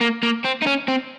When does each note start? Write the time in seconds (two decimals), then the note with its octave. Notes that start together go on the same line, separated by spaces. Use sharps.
0.01 A#3
0.23 A#3
0.44 C4
0.62 D#4
0.66 C#4
0.88 C4